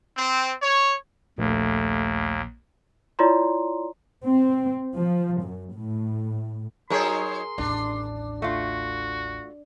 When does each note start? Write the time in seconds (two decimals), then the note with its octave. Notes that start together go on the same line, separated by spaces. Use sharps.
0.15 C4
0.61 C#5
1.38 A#1 D#2 A3
3.19 E4 F4 C#5 D5 A#5 C6
4.26 C4
4.95 F3
5.42 F#2
5.74 A2
6.90 F#3 D#4 G#4 A#4 C#5 C6
7.58 A1 D#2 D4
8.42 A3 F4 F#4